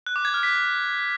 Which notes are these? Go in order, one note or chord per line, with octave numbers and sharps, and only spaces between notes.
F#6
D6
G#6
F6
B6